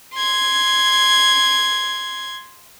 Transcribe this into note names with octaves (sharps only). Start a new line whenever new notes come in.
C6 G#6